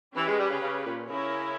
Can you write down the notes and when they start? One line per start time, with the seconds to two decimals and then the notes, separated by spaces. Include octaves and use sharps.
0.15 E3 C#4 G4 B4
0.27 G#3
0.38 G3
0.50 C#3
0.60 C#3
0.84 A#2
1.07 C#3 C#4 E4 A#4 C#5